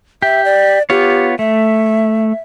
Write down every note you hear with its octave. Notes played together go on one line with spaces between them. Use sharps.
G4 E5
D5
B3 F4 G4 C#5
A3 E5